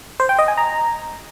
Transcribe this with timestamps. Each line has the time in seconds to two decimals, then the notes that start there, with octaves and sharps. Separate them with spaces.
0.20 C5
0.29 G5
0.39 D#5
0.48 G#5
0.57 A#5